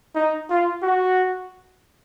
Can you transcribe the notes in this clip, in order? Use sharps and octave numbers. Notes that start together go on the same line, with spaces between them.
D#4
F4
F#4